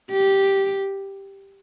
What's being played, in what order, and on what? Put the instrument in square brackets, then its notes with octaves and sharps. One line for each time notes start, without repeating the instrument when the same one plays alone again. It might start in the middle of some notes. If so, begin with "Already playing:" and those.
[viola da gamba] G4